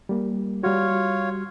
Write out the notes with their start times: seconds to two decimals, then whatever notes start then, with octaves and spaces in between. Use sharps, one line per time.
0.09 G3 A#3
0.63 G3 F4 F#4 C#5